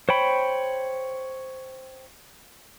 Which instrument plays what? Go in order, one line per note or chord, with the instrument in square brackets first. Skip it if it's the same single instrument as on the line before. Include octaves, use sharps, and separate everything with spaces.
[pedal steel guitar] C5 C#5 G5 B5